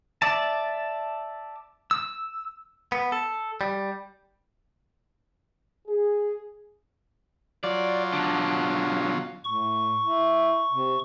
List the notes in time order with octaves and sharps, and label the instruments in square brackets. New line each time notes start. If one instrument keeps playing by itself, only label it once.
[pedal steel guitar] D5 E5 A5
E6
[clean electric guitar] B3
A4
G3
[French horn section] G#4
[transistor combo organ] F#3 F4 [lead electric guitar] D5
[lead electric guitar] B2 D3
[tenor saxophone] A2 [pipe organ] C#6
[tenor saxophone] E4
C3